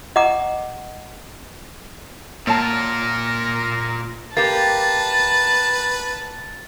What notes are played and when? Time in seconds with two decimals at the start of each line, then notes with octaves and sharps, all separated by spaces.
0.16 D#5 F#5 A#5 D6
2.47 A#2 A#3 F4 A#4 C#5 F#5 A5
4.37 A#3 G4 B4 A5 A6